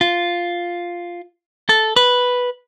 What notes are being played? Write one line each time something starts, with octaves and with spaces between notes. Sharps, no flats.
F4
A4
B4